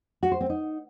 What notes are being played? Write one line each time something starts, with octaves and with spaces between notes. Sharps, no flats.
F#4
C5
C4
D#4